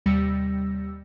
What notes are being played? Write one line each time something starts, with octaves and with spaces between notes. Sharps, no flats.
D#2 C3 G3 E6 A#6 C#7